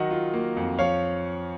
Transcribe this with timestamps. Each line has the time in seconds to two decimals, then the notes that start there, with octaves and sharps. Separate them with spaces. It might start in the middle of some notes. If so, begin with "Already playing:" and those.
Already playing: D#3 F#3 D#5 F#5
0.11 F4
0.34 A#3
0.57 F2
0.79 F3 C#5 F5